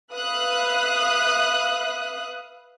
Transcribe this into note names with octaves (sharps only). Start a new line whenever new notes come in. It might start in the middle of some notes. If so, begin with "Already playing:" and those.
B4 E5 F5 D#6 F#6